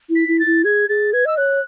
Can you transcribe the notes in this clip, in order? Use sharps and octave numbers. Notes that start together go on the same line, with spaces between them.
E4
B6
E4
A6
E4
G#4 G#6
G#4 A6
B4 G#6
D#5 E6
C#5 F#6